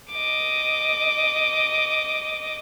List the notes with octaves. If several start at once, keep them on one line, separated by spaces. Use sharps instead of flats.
D#5 D6